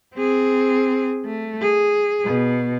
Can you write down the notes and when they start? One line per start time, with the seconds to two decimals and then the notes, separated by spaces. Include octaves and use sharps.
0.14 C4 G#4
1.25 A3
1.62 G#4
2.25 B2